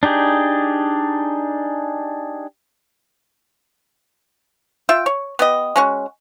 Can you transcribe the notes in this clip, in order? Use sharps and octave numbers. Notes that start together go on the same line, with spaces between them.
D4 D#4 G4 G#4
F4 E5 G5
C#5
B3 G4 D#5
G#3 C#4 F#4